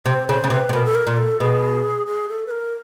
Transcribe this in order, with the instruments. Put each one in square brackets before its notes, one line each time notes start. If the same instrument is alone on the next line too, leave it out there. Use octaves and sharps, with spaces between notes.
[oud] C3 [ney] C5
[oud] C#3 [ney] C5
[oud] C#3
[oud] C3 [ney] B4
[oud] C3
[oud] B2 [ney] A#4
[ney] A4
A#4
[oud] A#2
[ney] A4
[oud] B2 [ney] G#4
[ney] G#4
A4
B4
A#4